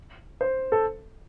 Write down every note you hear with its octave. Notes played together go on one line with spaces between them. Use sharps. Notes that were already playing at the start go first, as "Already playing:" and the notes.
C5
A4